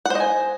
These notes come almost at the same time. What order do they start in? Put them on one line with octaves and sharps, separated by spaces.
F#5 C5 D#5 G#5